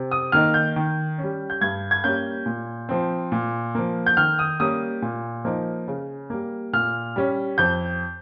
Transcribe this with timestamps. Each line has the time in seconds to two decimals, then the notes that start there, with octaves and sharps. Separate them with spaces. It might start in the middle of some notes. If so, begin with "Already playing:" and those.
Already playing: C3
0.11 D#6
0.32 D#3 A#3 D#4 F6
0.54 G6
0.76 D#3
1.18 G3 C#4
1.50 G6
1.61 G2 G#6
1.91 G#6
2.04 G3 A#3 C#4 G6
2.46 A#2
2.89 F3 C4
3.32 A#2
3.75 F3 A#3
4.06 G6
4.17 D#3 F6
4.39 D#6
4.60 G3 A#3 C#4 D#6
5.02 A#2
5.45 F3 A#3 D#4
5.88 C#3
6.30 G3 A#3
6.73 A#2 F6
7.16 G3 C#4
7.58 F2 G6